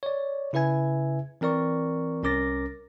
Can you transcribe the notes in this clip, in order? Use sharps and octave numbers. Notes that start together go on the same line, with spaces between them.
C#5 D5
C#3 E4 B4 E5 G#5 G#6
E3 C4 A#4 D5 C#6
C2 C#4 A#4 D6 A6 A#6